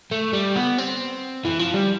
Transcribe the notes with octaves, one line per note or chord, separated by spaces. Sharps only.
A3
G3
B3
C4
E3
F3
G3